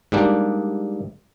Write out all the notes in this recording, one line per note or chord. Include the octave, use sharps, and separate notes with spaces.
G#2 G3 A#3 D4